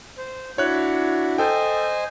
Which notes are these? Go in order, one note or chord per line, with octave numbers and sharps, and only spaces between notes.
C5
D4 E4 F#4 C#5 F#6
A4 C5 D#5 G5 G#5